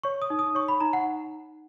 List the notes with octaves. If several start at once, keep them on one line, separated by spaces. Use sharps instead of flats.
C#5 C#6
D#6
D#4
D#6
C#5 C#6
B5
D#4 A#5
F#5